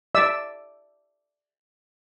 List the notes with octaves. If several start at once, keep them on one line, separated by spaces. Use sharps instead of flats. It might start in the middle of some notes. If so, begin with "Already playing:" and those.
D5 E5 E6